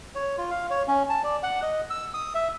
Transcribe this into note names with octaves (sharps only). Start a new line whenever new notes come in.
C#5
F4
F5
C#5
C#4
A5
D5
F#5
D#5
E6
D#6
E5